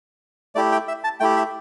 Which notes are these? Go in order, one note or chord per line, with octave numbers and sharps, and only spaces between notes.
A3 E4 G4 D5
G5
E5
A5
A3 E4 G4 G5
E5